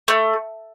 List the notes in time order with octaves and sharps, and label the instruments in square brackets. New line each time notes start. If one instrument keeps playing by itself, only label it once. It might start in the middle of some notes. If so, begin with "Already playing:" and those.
[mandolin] A3